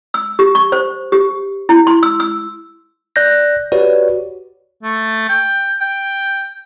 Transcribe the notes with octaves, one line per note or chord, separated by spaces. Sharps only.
E6
G4
C#6
C5
G4
E4
C6
E6
E6
D5 F#6 G6 A#6
F#4 G4 B4 C#5 D5
A3
G5
G5